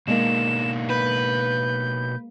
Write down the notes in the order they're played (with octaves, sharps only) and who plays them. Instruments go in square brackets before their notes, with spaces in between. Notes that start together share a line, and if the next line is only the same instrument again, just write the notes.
[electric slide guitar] B2 D4 D#4 [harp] G#3 A#3 A#4 [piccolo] E7
[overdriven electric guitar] B4 [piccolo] G6